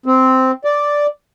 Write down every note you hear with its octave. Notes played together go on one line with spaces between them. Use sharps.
C4
D5